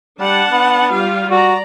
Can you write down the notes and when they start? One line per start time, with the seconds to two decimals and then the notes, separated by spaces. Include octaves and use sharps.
0.20 G3 D4 F#5 A5
0.52 B3
0.92 G3 F4 F5
1.31 F#4 D5 A#5